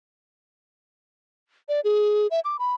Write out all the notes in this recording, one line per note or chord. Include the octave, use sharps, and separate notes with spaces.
D5
G#4
E5
D6
B5